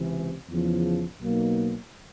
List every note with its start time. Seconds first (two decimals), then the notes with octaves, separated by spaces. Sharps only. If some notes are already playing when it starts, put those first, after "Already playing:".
Already playing: C#2 C3 E3
0.49 E2 C#3 F3
1.20 B1 B2 F#3 A#3 D#4